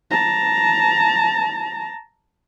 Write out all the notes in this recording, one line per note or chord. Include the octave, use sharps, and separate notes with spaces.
A5 A#5